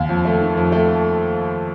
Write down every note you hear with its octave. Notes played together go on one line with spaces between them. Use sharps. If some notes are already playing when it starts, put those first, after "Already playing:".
Already playing: D#2
F2
A3
D#3
F2
A3